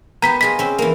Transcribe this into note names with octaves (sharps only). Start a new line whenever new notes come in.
B3 G4 A#5 B6
F4 G#4 D#5 B6
C4 C#4
E3 A#3